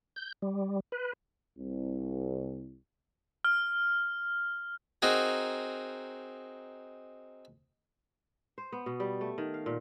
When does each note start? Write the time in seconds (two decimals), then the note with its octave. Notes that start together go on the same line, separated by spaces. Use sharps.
0.16 G6
0.42 G3
0.92 B4
1.59 C2
3.45 F6
5.02 C4 D#4 F#4 G#4 A#4
8.58 C5
8.72 B3
8.86 B2
9.00 G3
9.21 A3
9.38 D#3
9.54 F5
9.66 A#2